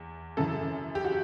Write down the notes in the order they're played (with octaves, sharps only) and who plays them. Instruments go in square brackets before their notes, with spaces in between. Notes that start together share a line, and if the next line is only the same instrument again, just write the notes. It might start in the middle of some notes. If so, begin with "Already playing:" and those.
Already playing: [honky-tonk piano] E2
F#2 C#3 E3 A4
G4
F#4